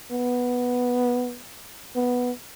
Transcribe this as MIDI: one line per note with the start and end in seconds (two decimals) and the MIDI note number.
0.11 1.40 59
1.95 2.31 59